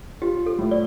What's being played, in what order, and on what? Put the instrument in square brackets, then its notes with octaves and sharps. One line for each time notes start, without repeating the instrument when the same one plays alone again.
[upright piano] F4 [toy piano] G4
[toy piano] A4
[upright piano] A2
[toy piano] D5